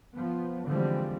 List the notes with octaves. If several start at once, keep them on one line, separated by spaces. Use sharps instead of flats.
F3 B3
D3 E3 F3 G3 G#3 C4